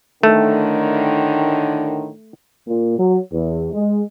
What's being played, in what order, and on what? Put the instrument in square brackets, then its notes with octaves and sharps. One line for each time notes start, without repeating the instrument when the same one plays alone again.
[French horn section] A2 D3 D#3 [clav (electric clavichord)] A3
[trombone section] A#2
F#3
E2
G#3